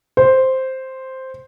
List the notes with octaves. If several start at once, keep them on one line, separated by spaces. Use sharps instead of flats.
C5